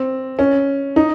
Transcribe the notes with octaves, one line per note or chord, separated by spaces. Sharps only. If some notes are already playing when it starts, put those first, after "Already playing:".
Already playing: C4
C#4
D#4